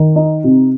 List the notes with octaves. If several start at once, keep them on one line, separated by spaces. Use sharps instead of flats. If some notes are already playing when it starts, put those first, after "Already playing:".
Already playing: D#3
D#4
C3